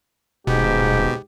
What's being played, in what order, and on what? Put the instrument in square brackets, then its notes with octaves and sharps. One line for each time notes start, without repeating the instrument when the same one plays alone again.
[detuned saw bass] D#1 [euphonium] G#2 [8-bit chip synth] B2 [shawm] G4